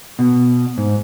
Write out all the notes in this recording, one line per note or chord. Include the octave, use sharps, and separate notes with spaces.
B2
G#2